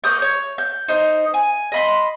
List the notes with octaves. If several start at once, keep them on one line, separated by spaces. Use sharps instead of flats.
A#3 C#5 D#6 G6
C#5
G6
D#4 C5
G#5
D#5 B5 C6